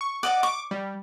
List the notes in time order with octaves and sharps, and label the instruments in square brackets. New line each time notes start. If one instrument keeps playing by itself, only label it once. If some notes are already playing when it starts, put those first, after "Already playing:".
[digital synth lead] C#6
[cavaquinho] D5 D#5 F#5 [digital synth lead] D6
[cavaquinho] C#6 [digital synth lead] D6
[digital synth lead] G3